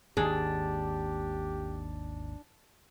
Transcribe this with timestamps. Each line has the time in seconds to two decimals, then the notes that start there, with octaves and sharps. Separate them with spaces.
0.17 G#1 D#2 G#2 D4 G4 G#4